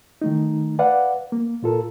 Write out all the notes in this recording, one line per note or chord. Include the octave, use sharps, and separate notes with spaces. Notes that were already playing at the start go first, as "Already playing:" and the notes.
D#3 A3 D#4
B4 D5 F5 F#5
A#3
A#2 F4 A4 A#4